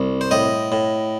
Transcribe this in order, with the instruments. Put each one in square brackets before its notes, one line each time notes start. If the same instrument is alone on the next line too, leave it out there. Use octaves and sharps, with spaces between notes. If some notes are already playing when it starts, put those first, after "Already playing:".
Already playing: [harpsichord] C2
C5
A2 D#5
A2